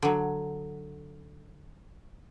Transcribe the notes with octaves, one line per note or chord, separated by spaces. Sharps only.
D3 F#3